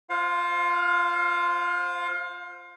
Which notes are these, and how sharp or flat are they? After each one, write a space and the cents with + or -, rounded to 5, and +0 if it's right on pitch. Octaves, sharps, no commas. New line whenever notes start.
F4 -10 C5 +0 F5 +30